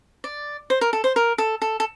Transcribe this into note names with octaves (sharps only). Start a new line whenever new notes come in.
D5
C5
A#4
A4
C5
A#4
A4
A4
A4